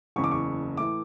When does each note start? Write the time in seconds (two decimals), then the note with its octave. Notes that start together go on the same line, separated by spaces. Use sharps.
0.16 F#1 E2 C#3 C#6
0.24 D6
0.31 C#6
0.77 A2 E3 A3 E4 D6